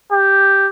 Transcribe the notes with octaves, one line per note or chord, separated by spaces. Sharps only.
G4